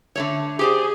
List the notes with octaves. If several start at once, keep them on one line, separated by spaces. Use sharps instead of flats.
D3 A3 C#5
G4 G#4 C5 D5